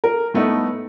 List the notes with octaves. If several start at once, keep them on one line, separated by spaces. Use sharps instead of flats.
A#4
A2 A3 B3 D#4